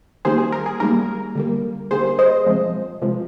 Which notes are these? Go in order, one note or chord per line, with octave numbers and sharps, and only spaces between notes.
D#3 G3 A#3 G#4 C5
G#4
A#4
G#4
D#3 G3 A#3 A#4
D3 G3 A#3
D3 G3 A#3 G#4 C5
C5 D#5
C3 F3 G#3
C3 F3 G#3